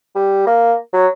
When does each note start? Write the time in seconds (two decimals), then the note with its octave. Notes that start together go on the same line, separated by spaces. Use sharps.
0.15 G3
0.47 A#3
0.93 F#3